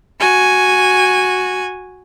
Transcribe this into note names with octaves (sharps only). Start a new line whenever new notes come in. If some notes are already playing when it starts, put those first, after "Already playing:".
F#4 G#5